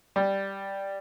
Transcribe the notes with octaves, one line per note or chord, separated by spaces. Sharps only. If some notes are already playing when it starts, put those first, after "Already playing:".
G3